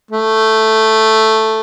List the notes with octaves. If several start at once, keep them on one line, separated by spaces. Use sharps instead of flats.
A3